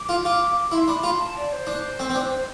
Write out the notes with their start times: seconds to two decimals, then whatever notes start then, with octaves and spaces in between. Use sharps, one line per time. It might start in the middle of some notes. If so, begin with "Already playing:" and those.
Already playing: D6
0.09 F4
0.25 F4
0.72 E4 C6
0.88 D4 B5
1.03 F4 C6
1.20 A5
1.35 D5
1.52 C5
1.67 D4
1.99 C4
2.10 C4
2.15 D4
2.31 C5